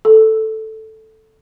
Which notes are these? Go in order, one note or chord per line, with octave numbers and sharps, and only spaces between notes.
A4